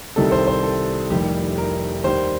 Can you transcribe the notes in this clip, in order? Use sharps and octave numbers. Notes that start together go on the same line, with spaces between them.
C2 C3 D#3 G3 A4
C5
C5
A4
F1 F2 D#3 G3 G4
A#4
D#2 D#3 G3 C5